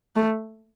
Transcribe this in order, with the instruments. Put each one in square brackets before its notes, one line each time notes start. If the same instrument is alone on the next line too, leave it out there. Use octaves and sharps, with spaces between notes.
[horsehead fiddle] A3